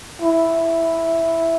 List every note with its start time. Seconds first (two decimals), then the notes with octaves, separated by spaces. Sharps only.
0.22 E4